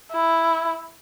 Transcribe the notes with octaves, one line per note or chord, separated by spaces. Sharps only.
E4